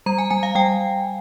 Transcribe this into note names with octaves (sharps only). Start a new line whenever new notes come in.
G3 A#5
G#5
G3 G#5
F5
G3 G5